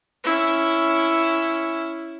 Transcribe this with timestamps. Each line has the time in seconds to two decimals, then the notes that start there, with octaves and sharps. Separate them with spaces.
0.23 C#4 E4